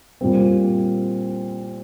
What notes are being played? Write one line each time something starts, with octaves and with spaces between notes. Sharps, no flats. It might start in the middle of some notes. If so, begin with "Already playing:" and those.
A#2 G3 C4